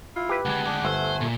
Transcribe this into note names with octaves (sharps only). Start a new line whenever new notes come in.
E4 F4
G4 B4
D2 G#3 F#5 A5
D4 G5 D6
G1 A3 C5 E5 G#5
A#2